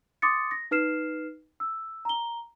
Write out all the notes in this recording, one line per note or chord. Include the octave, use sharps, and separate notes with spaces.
C6 D6 D#6 A6 C#7
A#6
D#4 B4 F6 C7 E7
E6
A#5 G7